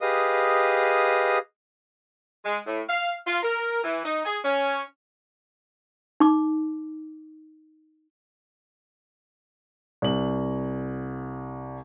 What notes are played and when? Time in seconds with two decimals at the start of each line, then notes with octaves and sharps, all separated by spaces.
0.01 G4 G#4 B4 D#5 F5 D#6
2.44 G#3
2.66 A2
2.88 F5
3.26 F4
3.42 A#4
3.83 E3
4.04 D#4
4.25 G#4
4.44 C#4
6.20 D#4 D6
10.02 C2 F#7